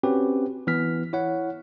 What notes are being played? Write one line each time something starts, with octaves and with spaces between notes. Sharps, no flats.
C4 C#4 F#4 G4 B4
E3 B3 F6 B6
E4 C#5 F#5